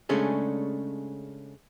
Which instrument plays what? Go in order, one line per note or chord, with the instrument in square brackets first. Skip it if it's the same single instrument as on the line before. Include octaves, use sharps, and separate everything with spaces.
[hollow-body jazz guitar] C#3 G#3 A3 C#4 D4 G#4